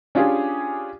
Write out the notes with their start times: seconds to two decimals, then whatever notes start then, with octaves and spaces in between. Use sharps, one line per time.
0.15 C#4 D4 F4 G4 G#4